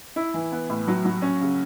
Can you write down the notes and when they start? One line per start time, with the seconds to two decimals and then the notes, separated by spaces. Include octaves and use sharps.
0.16 E4
0.34 E3
0.52 B3
0.69 A2
0.88 F#3
1.05 F#3
1.22 C#4
1.41 C#3